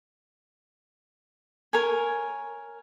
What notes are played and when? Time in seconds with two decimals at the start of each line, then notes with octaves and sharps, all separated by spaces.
1.73 A#4 C#5 G#5